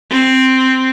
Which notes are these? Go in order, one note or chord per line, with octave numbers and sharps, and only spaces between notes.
C4